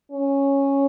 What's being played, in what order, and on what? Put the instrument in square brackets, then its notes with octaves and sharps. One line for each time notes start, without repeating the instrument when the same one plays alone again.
[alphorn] C#4